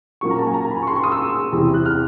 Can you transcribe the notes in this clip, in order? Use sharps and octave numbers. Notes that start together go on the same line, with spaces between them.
A#2 F#3 A#3 C#4 C#6
A#5
A5
G#5
A#5
B5
C#6
C6
C#6
D#6
E6
E2 C3 E3
F#6
F6